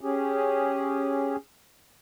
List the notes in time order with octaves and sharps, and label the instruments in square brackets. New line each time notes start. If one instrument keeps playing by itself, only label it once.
[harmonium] C#4 G4 G#4